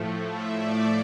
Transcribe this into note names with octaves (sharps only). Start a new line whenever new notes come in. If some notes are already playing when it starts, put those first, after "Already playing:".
Already playing: A2 F3 A3
E5
D5